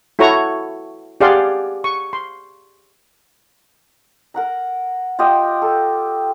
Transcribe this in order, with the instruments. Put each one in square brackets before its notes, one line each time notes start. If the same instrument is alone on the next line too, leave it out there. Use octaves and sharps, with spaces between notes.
[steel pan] E4 F#4 A4 C#5 A#5 C#6
G4 G#4 D5 F5 F#5 C6
C#6
C6
[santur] A#4 F#5 A#5
F4 G4 D#5
A4